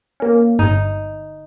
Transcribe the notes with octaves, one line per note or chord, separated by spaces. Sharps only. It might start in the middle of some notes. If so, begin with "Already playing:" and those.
A#3 C#4
G1 D#4